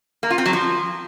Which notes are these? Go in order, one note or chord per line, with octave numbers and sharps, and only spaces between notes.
A#3
F4
C4
F#3
F3